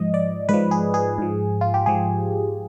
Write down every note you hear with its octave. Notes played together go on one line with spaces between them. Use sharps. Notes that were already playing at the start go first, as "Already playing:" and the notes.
Already playing: G#2 F3 D#5
D5
G#2 F3 B4
G#4
G#4
G#2 F3
F4
G4
G#2 F3 G#4